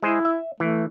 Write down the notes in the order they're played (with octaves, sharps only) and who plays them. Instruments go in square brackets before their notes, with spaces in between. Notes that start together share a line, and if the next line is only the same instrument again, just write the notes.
[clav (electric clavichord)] G#3 G#4 C5 [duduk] E4
[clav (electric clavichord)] E5
[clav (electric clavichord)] E3 [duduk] A3